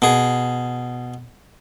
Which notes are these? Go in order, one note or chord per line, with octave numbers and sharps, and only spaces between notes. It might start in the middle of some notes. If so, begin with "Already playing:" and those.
B2 G#4